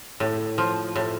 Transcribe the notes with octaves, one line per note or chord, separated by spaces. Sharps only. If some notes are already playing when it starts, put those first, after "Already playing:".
A2
F3
A2